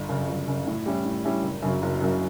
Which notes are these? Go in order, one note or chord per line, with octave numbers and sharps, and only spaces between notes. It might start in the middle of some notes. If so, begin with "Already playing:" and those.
Already playing: G1
F#2 C#3
G1
F#2 C#3
A2
G3 C#4 E4
A2
G3 C#4 E4
F#1
F#2 C#3 F#3
F#1
F#2 C#3 F#3